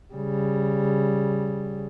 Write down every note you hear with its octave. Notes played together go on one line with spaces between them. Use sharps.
C#3 G3